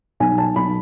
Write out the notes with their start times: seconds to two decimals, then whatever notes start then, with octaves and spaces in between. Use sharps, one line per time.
0.20 B1 G#5
0.38 A5
0.56 B1 B5